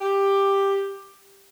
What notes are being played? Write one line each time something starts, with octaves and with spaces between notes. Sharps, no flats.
G4